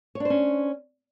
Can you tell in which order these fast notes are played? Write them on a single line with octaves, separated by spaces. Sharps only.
C#5 D4 C5 C#4